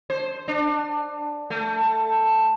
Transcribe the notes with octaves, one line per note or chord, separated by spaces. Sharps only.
C5
D4
A3